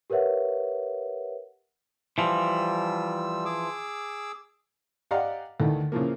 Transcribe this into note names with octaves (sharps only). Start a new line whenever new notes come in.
G4 A#4 B4 C#5 E5 F#5
E3 F3 G3 E6
G#4 D6 E6
G4 D5 D#5 F5 F#5 A#5
D2 D#3 E3 A3
C#3 E3 F3 A#3